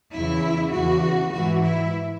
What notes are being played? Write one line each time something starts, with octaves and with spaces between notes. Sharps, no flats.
E2 C#3 E3 E4
E2 C#3 E3 F#4
G#2 E3 F#4
E4